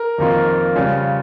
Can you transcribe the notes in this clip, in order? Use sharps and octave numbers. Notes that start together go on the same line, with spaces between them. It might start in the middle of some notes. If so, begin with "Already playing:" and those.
Already playing: A#4
F2 D#3 A#3 F4
C#3 G3 C#4 F4